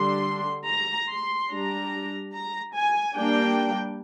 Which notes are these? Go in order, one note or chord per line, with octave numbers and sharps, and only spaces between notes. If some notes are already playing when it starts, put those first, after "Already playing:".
Already playing: D3 G3 D4 C6
A#5
C6
G3 D4 A#5
A#5
G#5
G3 A#3 D4 G5